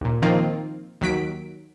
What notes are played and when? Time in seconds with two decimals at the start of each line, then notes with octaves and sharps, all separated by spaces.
0.01 D#2 A#2
0.22 D#3 F3 A#3 C4 D#4 F4
1.01 D#2 F#3 B6 D7